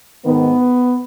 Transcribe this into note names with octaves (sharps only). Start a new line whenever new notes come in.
G#2 D#3 B3